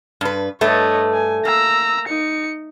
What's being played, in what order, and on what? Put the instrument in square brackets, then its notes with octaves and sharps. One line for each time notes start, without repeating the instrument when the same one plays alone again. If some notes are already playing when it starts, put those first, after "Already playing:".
[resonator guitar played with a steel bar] G2 B4
[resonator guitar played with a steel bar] G2 A3 B4 [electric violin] C#5 D#5
[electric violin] G#5
[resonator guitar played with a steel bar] A#3 [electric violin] A#5 E6
[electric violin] D#4 C#7